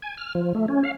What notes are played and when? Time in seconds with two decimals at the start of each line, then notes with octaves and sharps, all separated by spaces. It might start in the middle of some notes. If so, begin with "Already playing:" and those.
0.02 G#5
0.17 F6
0.35 F3
0.55 A3
0.68 C#4
0.84 F5